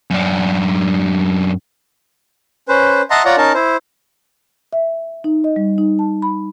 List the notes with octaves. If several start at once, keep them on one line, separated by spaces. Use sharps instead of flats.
F#2 D4
C#4 B4 C5
D#5 E5 F#5 A5 A#5 C6
F4 C#5 D5 F#5 A#5
C#4 D#4 A#4 A5
E4 C5
E5
D#4
D#5
G3
D#4
A5
B5